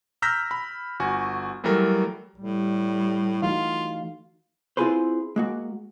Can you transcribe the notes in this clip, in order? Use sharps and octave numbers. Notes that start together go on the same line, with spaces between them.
A#5 E6 F6 G6 A#6 B6
B5
G1 F#4 G#5
E3 F#3 G3 A3 A4 A#4
A2 G3
E3 A3 D#4 F4 F#4 F5
C4 E4 F4 G#4 B4 C5
G#3 A#3 F#4